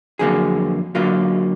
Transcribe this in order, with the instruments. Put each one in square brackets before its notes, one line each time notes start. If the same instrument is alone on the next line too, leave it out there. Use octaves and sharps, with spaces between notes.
[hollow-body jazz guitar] F2 D3 F#3 A#3 G#4
D3 F#3 A#3 F4